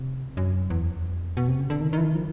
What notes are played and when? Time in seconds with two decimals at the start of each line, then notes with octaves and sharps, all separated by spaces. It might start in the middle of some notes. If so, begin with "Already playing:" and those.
Already playing: C3
0.37 F#2
0.70 E2
0.87 F2
1.37 B2
1.48 C3
1.59 C#3
1.70 D3
1.81 D#3
1.93 D#3
1.98 E3
2.03 D#3
2.15 F3